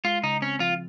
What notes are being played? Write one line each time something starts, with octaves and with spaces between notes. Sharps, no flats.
G#3 F4
C#3 D#4
C4 C#4
F3 F4